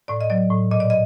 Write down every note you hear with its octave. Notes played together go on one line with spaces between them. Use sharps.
A2 D5
D#5
F#3 D5
A2
A#2 D#5
D5
D#5